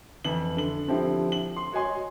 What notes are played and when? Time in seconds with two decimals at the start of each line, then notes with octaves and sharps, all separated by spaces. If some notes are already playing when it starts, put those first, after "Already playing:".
0.25 F2 E3 F#7
0.57 D3 F#7
0.88 D3 F3 C4 E4 G4
1.32 F#7
1.56 C6
1.72 F#4 C#5 D#5 G#5 C6